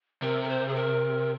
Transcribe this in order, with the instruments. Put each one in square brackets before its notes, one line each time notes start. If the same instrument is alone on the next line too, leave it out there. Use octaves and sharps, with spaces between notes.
[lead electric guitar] C3 [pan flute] A#4
[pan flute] A#4
C5
G#4
A#4